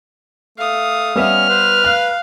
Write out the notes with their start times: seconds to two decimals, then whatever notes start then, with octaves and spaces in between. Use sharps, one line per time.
0.58 A3 F5 D#6
1.15 G3 B3 C#4 E5 F6
1.49 B4 C5
1.84 F5 F#6